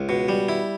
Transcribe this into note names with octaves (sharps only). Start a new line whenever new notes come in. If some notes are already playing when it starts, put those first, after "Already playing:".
Already playing: C#2
B2
G3
E4